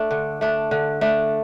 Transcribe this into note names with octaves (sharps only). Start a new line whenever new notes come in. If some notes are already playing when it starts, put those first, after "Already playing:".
Already playing: A3 D4
D3
A3 D4
D3
A3 D4